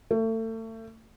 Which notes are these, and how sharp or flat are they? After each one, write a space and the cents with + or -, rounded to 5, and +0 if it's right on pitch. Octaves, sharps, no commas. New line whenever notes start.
A3 +30